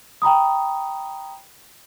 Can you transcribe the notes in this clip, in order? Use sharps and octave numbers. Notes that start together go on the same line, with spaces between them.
G5 A#5 B5 D#6